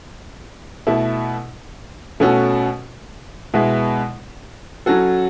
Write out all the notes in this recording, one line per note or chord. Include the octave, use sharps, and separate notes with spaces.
B2 A3 E4 A4
B2 A3 C#4 F#4 A4
B2 G#3 B3 E4
F#3 C#4 F#4 A4